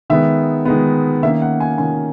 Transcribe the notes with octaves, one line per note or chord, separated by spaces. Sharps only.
D#3 G#3 B3 E5
D#3 G#3 B3
D#3 A#3 C#4 E5
F#5
G#5
D#3 A#3 C#4 G#5